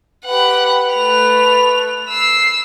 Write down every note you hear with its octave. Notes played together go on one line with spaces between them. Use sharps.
G4 B4 F#5
A3 F7
E6 C7